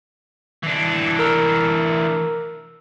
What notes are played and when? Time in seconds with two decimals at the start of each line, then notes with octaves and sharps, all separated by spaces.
0.63 E3 D4
1.19 A#4 A#5 E6